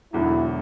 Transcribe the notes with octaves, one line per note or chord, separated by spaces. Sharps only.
E1 E2 D3 F#3 E4